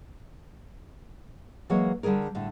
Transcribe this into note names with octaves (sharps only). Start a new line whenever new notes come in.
E3 F#3 G#3 A#3 C#5
D3 G3 D4 G#4 A#4
A2 D3